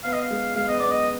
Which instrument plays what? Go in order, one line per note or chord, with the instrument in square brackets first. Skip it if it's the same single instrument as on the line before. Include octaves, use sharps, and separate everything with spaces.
[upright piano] B3 [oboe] F5
[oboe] D#5
F5
[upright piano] G#3
[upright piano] G#3 [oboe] F5
[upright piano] B3 [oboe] D#5
[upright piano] B3 [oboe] D5
[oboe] D#5